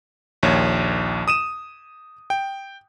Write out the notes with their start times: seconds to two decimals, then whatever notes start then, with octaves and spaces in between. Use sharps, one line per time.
0.43 A#1 D#2 C#5
1.28 D#6 D#7 E7
2.30 G5